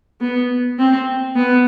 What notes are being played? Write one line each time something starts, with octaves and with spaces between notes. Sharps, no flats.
B3
C4
B3